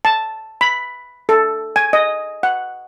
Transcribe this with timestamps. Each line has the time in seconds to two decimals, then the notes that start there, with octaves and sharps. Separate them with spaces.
0.05 A5
0.61 B5
1.29 A4
1.76 G#5
1.93 D#5
2.43 F#5